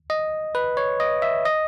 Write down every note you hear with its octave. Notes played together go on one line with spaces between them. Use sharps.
D#5
B4
C#5
D#5
E5
D#5